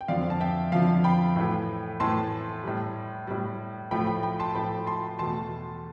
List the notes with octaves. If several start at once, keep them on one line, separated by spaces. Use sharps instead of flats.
G5
F2 D3 F3 D5 F5
A5
E5 G5
F2 D3 F3 F5 A5
G5 B5
A2 E3 A3
A2 E3 A3 A5 C6
A2 G3
A2 G3
A2 F3 A3 G5 B5
G5 B5
G5 B5
A5 C6
A2 F3 A3 G5 B5
A5 C6
E2 B2 A3 A5 C6